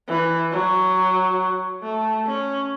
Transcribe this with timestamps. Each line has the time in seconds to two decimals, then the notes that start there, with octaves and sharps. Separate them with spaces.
0.08 E3
0.52 F#3
1.82 A3
2.27 C#4